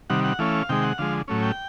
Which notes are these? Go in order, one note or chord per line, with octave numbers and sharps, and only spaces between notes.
C3 D#3 G3 F#5
F#5
E3 A3 C#4 F5
C3 D#3 G#3 G5
F#5
D3 F3 G#3 F5
A2 F#3 A3 C#4
G5